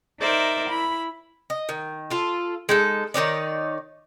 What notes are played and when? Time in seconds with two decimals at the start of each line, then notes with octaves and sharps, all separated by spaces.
0.20 D#4 A#4 C5 D5 E5
0.69 E4 B5
1.50 D#5
1.69 D#3
2.10 F4 A4
2.69 G#3 D#4 A4
3.14 D#3 D#4 C#5 D5